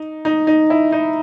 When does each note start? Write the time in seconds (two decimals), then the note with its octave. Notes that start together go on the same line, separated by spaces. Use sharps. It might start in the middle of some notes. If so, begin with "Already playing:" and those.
Already playing: D#4
0.25 D#4
0.47 D#4
0.70 E4
0.92 D#4